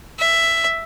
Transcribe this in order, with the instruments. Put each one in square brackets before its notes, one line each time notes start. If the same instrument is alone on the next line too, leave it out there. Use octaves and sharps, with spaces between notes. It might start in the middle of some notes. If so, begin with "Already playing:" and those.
[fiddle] E5